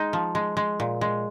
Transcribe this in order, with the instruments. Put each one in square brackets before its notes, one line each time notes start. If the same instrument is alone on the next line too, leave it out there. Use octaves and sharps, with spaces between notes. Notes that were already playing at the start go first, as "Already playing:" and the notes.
Already playing: [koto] G#3 D#4
F3
G#3
G#3
A#2
G#3